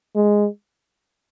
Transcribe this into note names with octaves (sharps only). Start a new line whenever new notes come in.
G#3